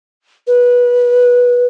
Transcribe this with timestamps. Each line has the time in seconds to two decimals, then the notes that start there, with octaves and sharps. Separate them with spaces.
0.47 B4